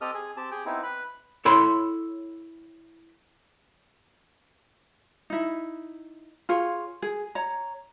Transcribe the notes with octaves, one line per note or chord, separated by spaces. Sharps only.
C4 G4 A4 D#5 D#6 F6
G#4
C4 G4 A5
G4 G#4 G5
B3 C4 D#4 E4
B4 B5
E4 A4 C#5 B5 C6
D#4 E4
F4 G#4 C#5
G#4
C#5 A#5